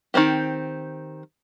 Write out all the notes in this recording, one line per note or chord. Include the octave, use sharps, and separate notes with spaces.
D#3 E3 C4 G4